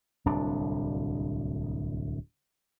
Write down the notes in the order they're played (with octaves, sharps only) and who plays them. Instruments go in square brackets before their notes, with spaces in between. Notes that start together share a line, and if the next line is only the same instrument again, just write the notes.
[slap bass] D1 C2 D4